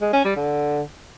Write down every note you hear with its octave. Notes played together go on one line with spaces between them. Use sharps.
G#3
C#4
G3
D3